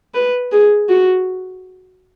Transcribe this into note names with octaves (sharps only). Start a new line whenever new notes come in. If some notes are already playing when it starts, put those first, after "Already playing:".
B4
G#4
F#4